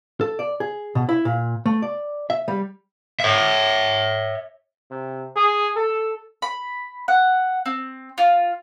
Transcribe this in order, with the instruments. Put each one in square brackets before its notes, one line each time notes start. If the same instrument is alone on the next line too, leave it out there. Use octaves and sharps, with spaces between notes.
[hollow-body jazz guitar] A4
D5
G#4
B2
E4
A#2
A3
D5
E5
G3
[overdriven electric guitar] C#5 E5
[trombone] C3
G#4
A4
[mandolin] B5
F#5
C4
F4